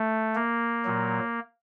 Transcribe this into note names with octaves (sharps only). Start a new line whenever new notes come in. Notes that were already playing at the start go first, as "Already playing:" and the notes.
Already playing: A3
A#3
A#2 F#3